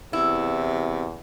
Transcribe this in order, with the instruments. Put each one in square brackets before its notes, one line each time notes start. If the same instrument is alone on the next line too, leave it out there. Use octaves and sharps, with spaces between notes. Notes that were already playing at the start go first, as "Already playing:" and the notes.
[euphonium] E2 [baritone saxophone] C3 [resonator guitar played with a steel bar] E4